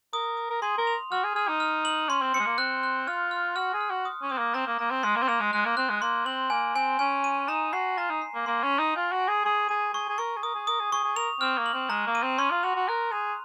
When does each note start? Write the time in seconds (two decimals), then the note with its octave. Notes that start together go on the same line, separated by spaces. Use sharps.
0.13 A#4 D#6
0.37 D#6
0.50 A#4
0.62 G#4 C6
0.78 A#4
0.87 F7
1.11 F#4 F6
1.24 G#4
1.35 G#4 F6
1.48 D#4
1.60 F6
1.85 F#7
2.09 C#4 C6
2.21 C4
2.34 C4 C#7
2.40 G#3
2.46 A#3
2.58 C4 F#6
2.83 F#6
3.08 F4 F6
3.31 F6
3.56 F#4 F6
3.73 G#4
3.81 F6
3.90 F#4
4.05 D#6
4.22 C#4
4.29 C4 D#6
4.38 A#3
4.54 C4 A#5
4.67 A#3
4.79 A#3 A#5
4.91 C4
5.03 G#3 C6
5.16 A#3
5.22 C4
5.28 A#3 F7
5.40 G#3
5.52 G#3 F#6
5.65 A#3
5.77 C4 F#6
5.89 G#3
6.02 A#3 C6
6.25 C4 F#7
6.50 A#3 G#5
6.75 C4 G#5
6.99 C#4 G#5
7.24 D#7
7.48 D#4 A#5
7.73 F#4 C7
7.98 F4 A#5
8.09 D#4
8.22 C7
8.35 A#3
8.46 A#3 C6
8.63 C#4
8.72 F#7
8.79 D#4
8.96 F4 G#5
9.12 F#4
9.20 G#5
9.28 G#4
9.45 G#4 C#6
9.69 G#4 D#7
9.93 G#4 C#6
10.09 G#4
10.18 A#4 C#6
10.37 G#4
10.43 A#4 D#6
10.55 G#4
10.67 A#4 D#6
10.80 G#4
10.92 G#4 C#6
11.04 G#4
11.16 A#4 F7
11.40 C4 F6
11.58 A#3
11.66 F#7
11.74 C4
11.89 G#3 A#5
12.07 A#3
12.15 D#7
12.23 C4
12.38 C#4 C6
12.51 F4
12.63 F#4 F7
12.76 F#4
12.88 A#4 F#6
13.12 G#4 F7